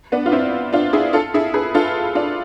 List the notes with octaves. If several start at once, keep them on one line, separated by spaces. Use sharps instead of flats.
B3 D4
F4
C4 E4
D4 F4
E4 G#4
F4 A4
E4 G#4
G#4 B4
F4 A4
D4 F4